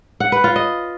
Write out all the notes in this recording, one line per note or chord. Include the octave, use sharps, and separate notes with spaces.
F#5
B4
F4
D#5